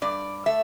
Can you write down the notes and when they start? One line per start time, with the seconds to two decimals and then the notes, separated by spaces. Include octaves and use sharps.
0.02 G2 D5
0.46 A3 E5